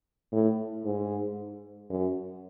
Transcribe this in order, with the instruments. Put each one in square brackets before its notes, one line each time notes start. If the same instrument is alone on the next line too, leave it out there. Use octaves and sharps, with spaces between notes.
[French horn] A2
G#2
F#2